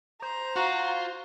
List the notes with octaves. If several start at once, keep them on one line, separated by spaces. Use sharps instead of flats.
C5 A#5
F4 F#4